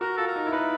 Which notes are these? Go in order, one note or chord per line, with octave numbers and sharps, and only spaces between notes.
F#4 A#4
F4 A4
A#4
D#4
E4
D#4 B4